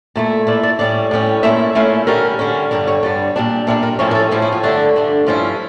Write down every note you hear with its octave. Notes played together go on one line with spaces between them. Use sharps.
A#2 A3 E4
A#2 A3 E4 D5
D5
A2 G3 C#4 D5
A2 G3 C#4
A#2 A3 C#4 E4 E5
A#2 A3 C#4 E4 F5
D3 G3 C#4 A#4
D3 G3 C#4
G2 D3 G3 A#4
C#5
G2 D3 G3 D5
A#2 G3 D4
A#2 G3 D4 E5
A#4
A2 F3 C#4 E4 C#5
A#4
A4
A2 F3 C#4 E4 G4
E4
F4
G2 D3 A3 D4 E4
G2 D3 A3 D4
G2 F3 C#4 E4 F4